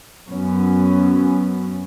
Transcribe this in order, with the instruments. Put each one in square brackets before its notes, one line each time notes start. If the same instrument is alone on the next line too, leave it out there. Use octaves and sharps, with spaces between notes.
[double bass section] F#2 B3 C#4